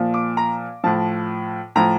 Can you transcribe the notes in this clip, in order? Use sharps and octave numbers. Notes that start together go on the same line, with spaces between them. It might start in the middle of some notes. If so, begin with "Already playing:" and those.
Already playing: A#2 F3
D6
A#5
A2 F3 A5
A2 F3 A#5